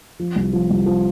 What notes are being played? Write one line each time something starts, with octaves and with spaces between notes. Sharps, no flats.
F3
C2
F3
C2
F3